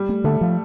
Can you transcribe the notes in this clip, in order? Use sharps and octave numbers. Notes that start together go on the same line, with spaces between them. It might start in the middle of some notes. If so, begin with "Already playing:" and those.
Already playing: G3
A3
D3 A3
F3